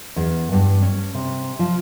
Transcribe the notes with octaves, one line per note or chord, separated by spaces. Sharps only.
E2
G2
C#4
C3
F3